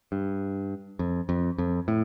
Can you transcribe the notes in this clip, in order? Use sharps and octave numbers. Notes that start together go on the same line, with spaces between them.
G2
F2
F2
F2
A2